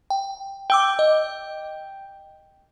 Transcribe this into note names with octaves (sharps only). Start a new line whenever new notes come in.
G5
G5 D6 E6 G7
D#5